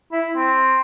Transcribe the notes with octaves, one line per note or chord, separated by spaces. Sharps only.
E4
C4